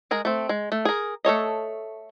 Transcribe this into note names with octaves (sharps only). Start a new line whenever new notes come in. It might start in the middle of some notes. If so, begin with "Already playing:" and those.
G#3 G#4 A#4
A3 C4
G#3
A3
G#4 A#4
A3 A4 C#5 D#5